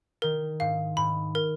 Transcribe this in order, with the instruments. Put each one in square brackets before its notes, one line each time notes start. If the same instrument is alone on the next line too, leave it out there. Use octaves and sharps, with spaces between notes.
[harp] D#3 [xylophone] A#4
[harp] G#2 [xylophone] F5
[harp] G#2 [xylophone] B5
[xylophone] A#4